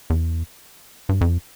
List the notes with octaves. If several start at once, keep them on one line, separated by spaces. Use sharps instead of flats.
E2
G2
F2